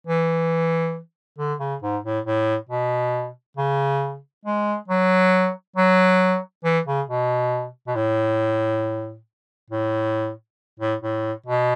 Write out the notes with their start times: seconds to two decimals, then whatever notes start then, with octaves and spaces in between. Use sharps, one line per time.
0.07 E3
1.38 D3
1.60 C#3
1.82 G#2
2.04 A2
2.25 A2
2.69 B2
3.57 C#3
4.45 G#3
4.88 F#3
5.76 F#3
6.64 E3
6.86 C#3
7.07 B2
7.87 B2
7.95 A2
9.70 A2
10.80 A2
11.02 A2
11.46 B2